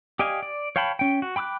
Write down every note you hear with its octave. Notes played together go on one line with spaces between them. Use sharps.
G4 D5 D#5 F5 G#5
D5
C#5 F5 G5 A5 B5
C#4 G5
F#4
G5 B5 D6 E6 F#6